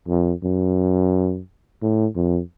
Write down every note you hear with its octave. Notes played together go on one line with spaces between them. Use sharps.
F2
F#2
A2
F2